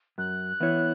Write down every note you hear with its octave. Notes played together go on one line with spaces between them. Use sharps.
F#2 F#6
E3 B3 E4 C#5